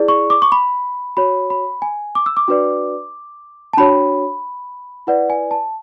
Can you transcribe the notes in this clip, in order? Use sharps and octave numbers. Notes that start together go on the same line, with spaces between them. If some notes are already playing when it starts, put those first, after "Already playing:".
Already playing: E4 G#4 D5
C#6
D6
C#6
B5
F#4 C#5 B5
B5
G#5
D6
E6
D6
D4 F#4 B4 D5
A5
D4 F#4 C#5 B5
E4 B4 D5 F#5
G#5
A5